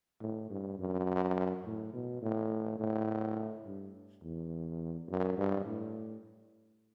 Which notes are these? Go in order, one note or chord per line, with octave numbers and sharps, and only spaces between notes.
A2
G2
F#2
A2
B2
A2
A2
G2
E2
F#2
G2
A2